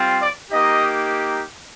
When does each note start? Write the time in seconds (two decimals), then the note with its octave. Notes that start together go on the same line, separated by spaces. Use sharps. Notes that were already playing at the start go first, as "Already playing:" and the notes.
Already playing: G3 C4 F4
0.22 D5
0.51 A#3 D#4 G4 D#5